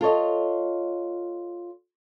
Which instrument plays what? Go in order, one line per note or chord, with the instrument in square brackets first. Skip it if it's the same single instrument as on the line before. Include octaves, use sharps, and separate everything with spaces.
[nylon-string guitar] F4 A4 C#5 D#5